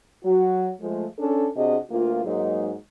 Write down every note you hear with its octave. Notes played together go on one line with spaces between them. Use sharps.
F#3 F#4
F3 G#3 A3
C#4 D4 A4
C3 D4 F#4 G#4 D#5
D2 A#3 F4
G#2 F#3 G#3 A#3 D#4